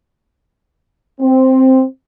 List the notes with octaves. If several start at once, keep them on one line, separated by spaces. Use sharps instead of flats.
C4